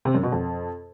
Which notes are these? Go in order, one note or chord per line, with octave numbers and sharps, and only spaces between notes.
C3
F#2
B2
F2